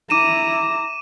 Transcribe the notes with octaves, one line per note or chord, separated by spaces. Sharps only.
E4 A#5 D6 D#7 E7